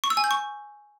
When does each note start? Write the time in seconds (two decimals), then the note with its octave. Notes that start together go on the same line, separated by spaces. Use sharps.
0.04 C#6
0.10 E6
0.17 G#5
0.24 G6
0.31 C#6